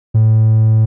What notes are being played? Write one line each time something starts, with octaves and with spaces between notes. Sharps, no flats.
A2